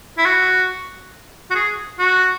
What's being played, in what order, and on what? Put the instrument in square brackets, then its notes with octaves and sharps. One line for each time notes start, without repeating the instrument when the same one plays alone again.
[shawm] E4
F#4
F#4
G#4
F#4